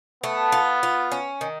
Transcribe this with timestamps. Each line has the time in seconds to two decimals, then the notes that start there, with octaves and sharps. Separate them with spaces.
0.24 A3 B3
0.52 F4
0.83 F4
1.12 C#4
1.41 D#3